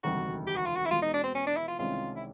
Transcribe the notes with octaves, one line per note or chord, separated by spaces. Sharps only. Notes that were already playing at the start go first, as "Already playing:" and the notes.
E1 D2 C3 D#3 G3 F#4
G4
F#4
F4
F#4
E4
E2 B2 G#3 F4
D#4
D4
C4
C#4
D4
E4
F4
C2 C3 D#3 G#3 C#4 F4
E4